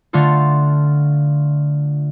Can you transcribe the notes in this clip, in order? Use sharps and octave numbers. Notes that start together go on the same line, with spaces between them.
D3 A3 F4 A4